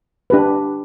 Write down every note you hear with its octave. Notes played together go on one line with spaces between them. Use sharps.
D4 G4 B4